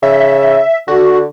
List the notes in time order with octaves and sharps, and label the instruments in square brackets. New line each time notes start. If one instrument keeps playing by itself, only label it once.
[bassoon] C#3 [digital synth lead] E5
[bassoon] D3 [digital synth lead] F#4